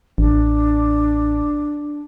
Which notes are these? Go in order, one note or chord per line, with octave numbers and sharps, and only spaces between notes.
A1 D4